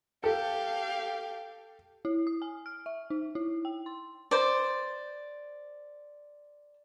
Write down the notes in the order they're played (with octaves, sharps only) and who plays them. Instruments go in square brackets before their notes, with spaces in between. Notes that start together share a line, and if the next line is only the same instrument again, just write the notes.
[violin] G4 F5 [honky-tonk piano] A4
[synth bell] E4
D#6
G#5
F6
E5
D#4
E4
G5
C6
[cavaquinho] C5 D5